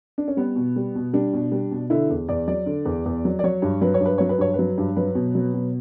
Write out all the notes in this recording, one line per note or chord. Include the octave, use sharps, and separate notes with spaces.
D4
C#4
G3 B3
B2
G3
B2
G3 D4
B2
G3
B2
D3 E4
E2
E2 D5
F#3 D5
D3
E2
E2
F#3
D5
F#3 C#5
G2
F#3 B4
C#5
G2
B4
F#3 C#5
B4
G2 C#5
F#3 B4
G2
F#3 B4
B2
F#3
B2